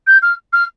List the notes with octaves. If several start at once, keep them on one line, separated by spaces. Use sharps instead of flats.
G6
F6
F6